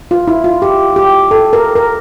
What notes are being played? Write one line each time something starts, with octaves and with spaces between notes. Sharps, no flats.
F4
E4
F4
G4
G4
A4
A#4
A#4